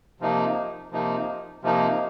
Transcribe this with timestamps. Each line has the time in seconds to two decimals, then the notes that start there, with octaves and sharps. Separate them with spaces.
0.20 C3 F3 A#3 D#4
0.92 C3 F3 A#3 D#4
1.62 C3 F3 A#3 D#4